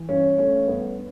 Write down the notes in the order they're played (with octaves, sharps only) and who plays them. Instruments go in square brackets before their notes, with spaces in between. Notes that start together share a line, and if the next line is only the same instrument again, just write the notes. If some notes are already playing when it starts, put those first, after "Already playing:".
Already playing: [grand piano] E3
[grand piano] G2 [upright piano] C#4
[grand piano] A3 [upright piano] C#4
[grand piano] G2 [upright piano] B3